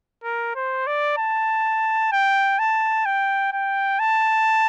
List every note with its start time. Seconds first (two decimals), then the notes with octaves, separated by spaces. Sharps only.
0.24 A#4
0.56 C5
0.87 D5
1.18 A5
2.12 G5
2.59 A5
3.06 G5
3.53 G5
3.99 A5